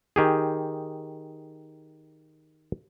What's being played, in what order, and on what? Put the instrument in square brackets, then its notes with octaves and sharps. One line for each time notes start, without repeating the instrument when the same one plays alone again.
[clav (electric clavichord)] D#3 G4 G#4